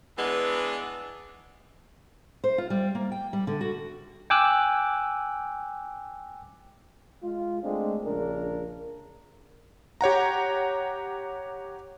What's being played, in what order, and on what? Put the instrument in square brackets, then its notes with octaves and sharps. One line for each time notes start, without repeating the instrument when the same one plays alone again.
[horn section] E3 G#3 B3 D4
[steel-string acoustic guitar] C5
F4
G3
A#3
G5
G3
D3
F#4
[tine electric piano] G5 G#5 D6 E6 F#6
[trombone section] G#3 F4
G#3 A3 C4 D4
A#1 C#3 D4 A#4
[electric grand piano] G4 C#5 F#5 A#5